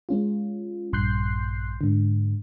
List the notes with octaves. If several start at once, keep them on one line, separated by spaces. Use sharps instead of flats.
G#3 C#4 F4
A#1 G2 C6 F#6 G6 C7
G#2 D3